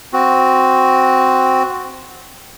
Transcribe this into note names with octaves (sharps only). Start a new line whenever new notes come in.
C4 F#4